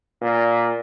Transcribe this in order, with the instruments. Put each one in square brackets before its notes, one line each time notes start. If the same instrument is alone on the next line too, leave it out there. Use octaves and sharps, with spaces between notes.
[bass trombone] A#2